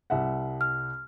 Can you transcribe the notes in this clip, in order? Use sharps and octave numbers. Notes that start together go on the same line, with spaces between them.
C2 E5 F#5
F6